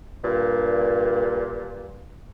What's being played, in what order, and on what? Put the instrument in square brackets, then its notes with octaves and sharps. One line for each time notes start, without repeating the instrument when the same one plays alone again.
[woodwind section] G2 A#2